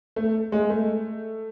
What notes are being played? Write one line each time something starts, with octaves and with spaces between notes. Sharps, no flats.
A3
G#3
A3